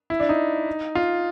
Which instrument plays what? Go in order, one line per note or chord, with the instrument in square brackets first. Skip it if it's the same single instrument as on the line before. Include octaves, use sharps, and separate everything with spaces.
[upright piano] E4
D4
D#4
F4